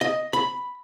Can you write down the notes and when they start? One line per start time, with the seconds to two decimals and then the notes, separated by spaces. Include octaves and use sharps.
0.01 D#5
0.33 B5